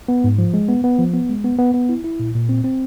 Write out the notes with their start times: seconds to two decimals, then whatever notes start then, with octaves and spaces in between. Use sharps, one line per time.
0.08 B3
0.24 G#2
0.38 F3
0.54 G#3
0.69 B3
0.84 B3
0.99 F3
1.13 B3
1.29 G#3
1.44 B3
1.59 B3
1.74 B3
1.89 E4
2.04 E4
2.19 A#2
2.35 A#2
2.49 C4
2.64 C4